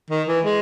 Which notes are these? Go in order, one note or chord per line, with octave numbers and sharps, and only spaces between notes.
D#3
E3
G#3